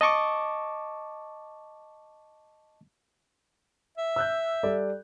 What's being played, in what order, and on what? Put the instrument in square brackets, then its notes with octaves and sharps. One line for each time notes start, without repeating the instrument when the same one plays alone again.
[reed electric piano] D#5 A5 C#6 D6
[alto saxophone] E5
[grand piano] E6 F#6 G6
G3 A4 D5